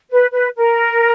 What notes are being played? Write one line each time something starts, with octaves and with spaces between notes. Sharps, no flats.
B4
B4
A#4